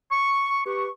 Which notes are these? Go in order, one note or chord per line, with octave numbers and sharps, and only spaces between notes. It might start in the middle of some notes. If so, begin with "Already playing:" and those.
C#6
G4 B4 C#6